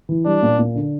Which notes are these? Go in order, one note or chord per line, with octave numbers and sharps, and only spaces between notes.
E3
G3 D4
A#2
A#2
D3